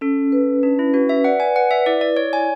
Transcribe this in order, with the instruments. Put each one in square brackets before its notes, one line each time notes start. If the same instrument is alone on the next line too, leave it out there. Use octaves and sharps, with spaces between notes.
[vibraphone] C#4 [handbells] A4
[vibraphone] B4
[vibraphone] C#4 [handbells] D4
[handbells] E4
[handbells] F#4 [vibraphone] B4
[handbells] E5
[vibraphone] D5 [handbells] F#5
[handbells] G#5
[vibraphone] B4 [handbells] F#5
[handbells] E5
[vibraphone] E4 [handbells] D5
[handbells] D5
[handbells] C#5 [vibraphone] D5
[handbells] G#5